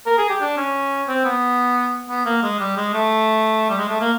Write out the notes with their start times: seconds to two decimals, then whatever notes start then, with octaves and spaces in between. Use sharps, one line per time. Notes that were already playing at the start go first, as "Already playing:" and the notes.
0.06 A#4
0.18 G#4
0.29 G4
0.41 D4
0.57 C#4
1.08 C4
1.25 B3
2.09 B3
2.25 A#3
2.43 G#3
2.60 G3
2.76 G#3
2.94 A3
3.70 G3
3.78 G#3
3.89 A3
4.01 A#3